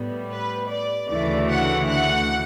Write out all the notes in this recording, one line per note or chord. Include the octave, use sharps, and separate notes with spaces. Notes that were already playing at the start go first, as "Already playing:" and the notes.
Already playing: A2 G3 B3
B4
D5
D2 C#3 E3 A3 D5
F#5
F#5